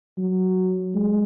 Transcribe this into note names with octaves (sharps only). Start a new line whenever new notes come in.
F#3
G#3